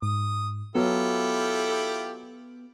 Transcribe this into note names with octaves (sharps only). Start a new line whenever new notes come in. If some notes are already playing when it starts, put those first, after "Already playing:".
G#2 D#6
F#3 B3 E4 F4 G4 A4